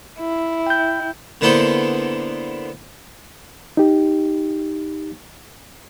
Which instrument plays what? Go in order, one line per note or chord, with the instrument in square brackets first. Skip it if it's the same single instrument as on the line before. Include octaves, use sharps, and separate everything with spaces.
[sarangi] E4
[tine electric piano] G5 G6
[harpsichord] D3 A#3 B3 E4 A4 C5
[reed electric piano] D#4 G4